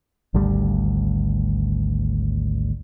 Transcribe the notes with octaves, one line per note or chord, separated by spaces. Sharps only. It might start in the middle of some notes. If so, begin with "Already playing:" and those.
G#1 D2 G3